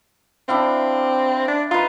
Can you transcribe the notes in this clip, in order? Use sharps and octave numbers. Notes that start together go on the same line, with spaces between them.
C4 D4 E4 F5
D4
D#4 F4 B4